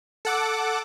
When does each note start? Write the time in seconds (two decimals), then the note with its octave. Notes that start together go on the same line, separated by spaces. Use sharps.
0.25 A4 F#5 D6